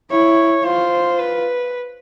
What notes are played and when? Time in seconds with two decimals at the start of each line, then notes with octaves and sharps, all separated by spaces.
0.11 E4 C#5
0.65 F4 C5
1.19 B4